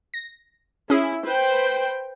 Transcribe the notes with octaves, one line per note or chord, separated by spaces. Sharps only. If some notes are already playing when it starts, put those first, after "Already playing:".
A#6
C#4 E4 G#4
B4 C5 G5